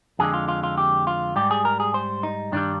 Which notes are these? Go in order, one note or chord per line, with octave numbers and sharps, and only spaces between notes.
F2 D3 G#3 G#4
F4
F4
F4
G4
F4
G#2 G3 G4
G#4
A#4
G#4
C5
D#4
G2 D#3 G3 D4